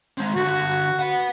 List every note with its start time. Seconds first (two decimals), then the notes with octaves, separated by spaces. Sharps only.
0.18 G#3 C4
0.36 D3 F#4 G4
0.99 B4 F#5